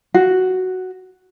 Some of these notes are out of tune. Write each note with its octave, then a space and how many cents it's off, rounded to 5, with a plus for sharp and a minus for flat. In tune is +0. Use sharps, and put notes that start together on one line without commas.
F#4 +5